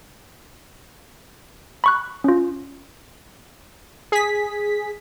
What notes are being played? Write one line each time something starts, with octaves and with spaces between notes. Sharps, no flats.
B5 C#6 F#6
C#4 F4
G#4 B6